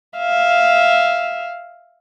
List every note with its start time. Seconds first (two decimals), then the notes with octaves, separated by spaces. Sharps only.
0.18 E5 F5